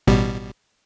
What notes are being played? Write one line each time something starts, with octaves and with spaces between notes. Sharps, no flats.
A1 B2 G3